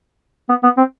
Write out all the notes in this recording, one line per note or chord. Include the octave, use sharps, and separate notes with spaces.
B3
B3
C4